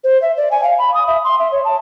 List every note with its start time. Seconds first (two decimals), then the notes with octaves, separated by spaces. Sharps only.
0.04 C5
0.22 E5
0.37 D5
0.51 G#5
0.63 F5
0.78 B5
0.94 D#6
1.07 E5
1.24 C6
1.39 E5
1.52 C#5
1.65 A5